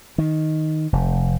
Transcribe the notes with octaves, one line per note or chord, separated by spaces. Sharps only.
D#3
F1